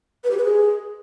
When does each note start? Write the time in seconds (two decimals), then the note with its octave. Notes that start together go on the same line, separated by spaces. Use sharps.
0.24 B4
0.31 G4
0.38 B4
0.44 G#4